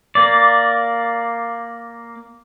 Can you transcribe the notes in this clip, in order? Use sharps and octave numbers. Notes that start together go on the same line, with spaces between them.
A#3 D5